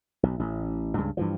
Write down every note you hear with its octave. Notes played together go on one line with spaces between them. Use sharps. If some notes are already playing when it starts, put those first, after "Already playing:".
B1
A1
C#2 G2 C#3
G2 E3 F3